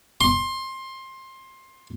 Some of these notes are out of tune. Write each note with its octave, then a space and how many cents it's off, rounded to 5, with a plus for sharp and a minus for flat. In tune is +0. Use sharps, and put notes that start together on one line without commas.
C6 +20